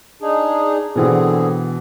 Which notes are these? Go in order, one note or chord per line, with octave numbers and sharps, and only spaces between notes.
D4 D#4 G#4
B2 D3 E3 C4 G#4